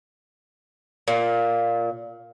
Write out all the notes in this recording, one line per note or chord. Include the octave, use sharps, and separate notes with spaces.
A#2